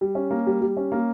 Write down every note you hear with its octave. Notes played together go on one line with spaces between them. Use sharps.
G3
C#4
A#3
G3
G3
C#4
A#3